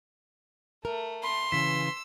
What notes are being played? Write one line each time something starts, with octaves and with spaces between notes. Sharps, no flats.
A3 A#4
B5 C6
C#3 E3 E6 B6